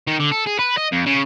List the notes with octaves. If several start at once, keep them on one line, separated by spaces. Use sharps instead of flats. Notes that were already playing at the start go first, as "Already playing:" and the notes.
D#3
D3
A4
G#4
B4
D#5
F2
C#3